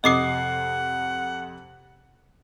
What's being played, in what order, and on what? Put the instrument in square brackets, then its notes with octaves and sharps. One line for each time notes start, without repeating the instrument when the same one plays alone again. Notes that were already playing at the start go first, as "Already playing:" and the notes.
[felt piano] F2 C3 C7 [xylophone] D#5 D6 D#6 [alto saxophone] F#5